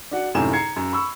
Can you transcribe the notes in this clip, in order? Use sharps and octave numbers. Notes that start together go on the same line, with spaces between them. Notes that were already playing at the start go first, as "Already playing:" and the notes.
D4 F#4 F#5
G#1 F#2 A2 C3 G#5 E7
A#5 G#6 C7 C#7
F#2
B5 C#6 E6